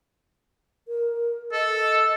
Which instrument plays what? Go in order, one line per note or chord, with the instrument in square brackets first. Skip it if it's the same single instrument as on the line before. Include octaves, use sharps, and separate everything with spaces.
[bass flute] A#4
[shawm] A4 [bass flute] D#5